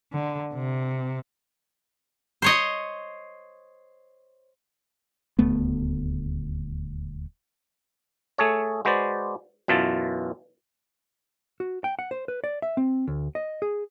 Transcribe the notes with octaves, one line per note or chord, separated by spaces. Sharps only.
D3
C3
C5 C#5 D#5
D#1 D2 A3 B3
A3 G#4 A4 C#5
G#3 F#4 B4 C5 D5
F#2 B2 E3 F4 A5
F#4
G5
F#5
C5
B4
D5
E5
C4
D2
D#5
G#4